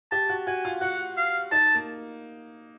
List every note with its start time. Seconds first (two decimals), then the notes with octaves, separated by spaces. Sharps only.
0.11 G4 A5
0.29 F#4
0.47 F#4 G#5
0.65 F4
0.81 F#4 F#5
1.17 F5
1.52 D#4 A5
1.75 A#3